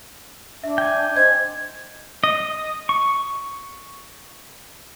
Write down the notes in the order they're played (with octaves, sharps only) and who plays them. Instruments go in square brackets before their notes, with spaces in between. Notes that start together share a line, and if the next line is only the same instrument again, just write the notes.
[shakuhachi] D4 [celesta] E5
[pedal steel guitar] G5 G#5
[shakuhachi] C5 [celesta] D#5 G#6
[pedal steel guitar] D#5
C#6